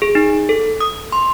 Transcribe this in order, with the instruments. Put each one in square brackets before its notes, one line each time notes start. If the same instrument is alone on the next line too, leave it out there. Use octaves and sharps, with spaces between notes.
[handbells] G#4
D#4
A4
D#6
C6